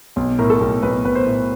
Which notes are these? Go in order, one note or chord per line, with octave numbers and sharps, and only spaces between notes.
B1
A2 A#4
A4
B1
B1 B4
B1 B4
C5
A2